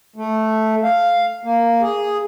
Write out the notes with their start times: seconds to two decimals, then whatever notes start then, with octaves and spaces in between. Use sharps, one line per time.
0.16 A3
0.84 F5
1.44 A#3
1.82 G#4